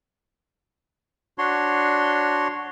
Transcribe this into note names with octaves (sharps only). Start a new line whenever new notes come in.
D4 F#4 C#5 C6